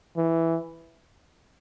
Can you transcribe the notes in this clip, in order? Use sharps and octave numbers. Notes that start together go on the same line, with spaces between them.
E3